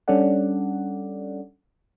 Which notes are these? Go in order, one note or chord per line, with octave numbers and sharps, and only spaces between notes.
G3 C#4 D4 A4 D5 F#5